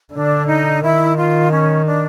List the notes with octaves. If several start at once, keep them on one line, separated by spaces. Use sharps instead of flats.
D3 D4
D#4
D#3 E4
F4
C#4
D4